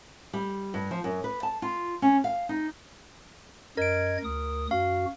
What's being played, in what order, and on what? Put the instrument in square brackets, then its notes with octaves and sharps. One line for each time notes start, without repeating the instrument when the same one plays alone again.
[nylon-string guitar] G3
G2
F3
F#2
B4
A5
F4
C#4
F5
D#4
[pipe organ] F#2 D#5 G#6 [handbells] A#4 D7
[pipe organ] D2 D#6
[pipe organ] F#2 F#4 [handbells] F5